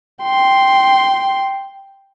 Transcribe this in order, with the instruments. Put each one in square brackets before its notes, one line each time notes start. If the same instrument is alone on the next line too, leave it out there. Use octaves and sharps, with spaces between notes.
[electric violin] G5 C6